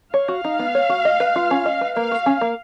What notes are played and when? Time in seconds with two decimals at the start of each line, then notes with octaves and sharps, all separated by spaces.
0.14 C#5 F5
0.28 F#4
0.44 D#4
0.59 B3
0.75 C#5
0.89 F#4
1.05 D#5
1.20 B4
1.36 F4
1.51 C#4
1.65 D#5
1.81 B4
1.96 A#3 F5
2.11 F#4
2.26 C#4
2.41 A#3